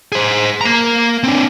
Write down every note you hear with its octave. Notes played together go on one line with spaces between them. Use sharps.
G#4 C5
A#3 A#5
C4 D4